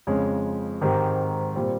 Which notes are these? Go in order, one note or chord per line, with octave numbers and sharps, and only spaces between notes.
F2 C#3 G#3 C#4 G#4
G#2 D#3 G#3 C4 G4
A#2 G3 C4